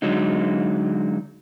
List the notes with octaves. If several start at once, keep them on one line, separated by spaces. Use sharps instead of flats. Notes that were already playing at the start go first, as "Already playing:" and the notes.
D3 F#3 G#3 D#4